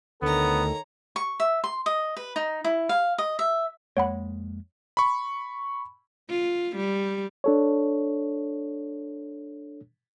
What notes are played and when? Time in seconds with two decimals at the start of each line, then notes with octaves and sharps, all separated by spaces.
0.22 D2 D#3 B3 A4 C#5 A#5
1.16 C#6
1.40 E5
1.64 C6
1.86 D#5
2.17 B4
2.36 D#4
2.64 E4
2.89 F5
3.18 D#5
3.39 E5
3.97 F2 G#3 A#3 C#5 F#5 B5
4.97 B5 C#6
6.29 F4
6.76 G3
7.44 D4 A4 C#5